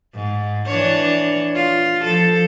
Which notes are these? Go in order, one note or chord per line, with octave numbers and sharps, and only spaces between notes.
G#2
E3 D4 C#5
F4
F3 A4